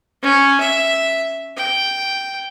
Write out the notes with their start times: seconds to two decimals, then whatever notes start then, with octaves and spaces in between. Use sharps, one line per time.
0.22 C#4
0.60 E5
1.57 G5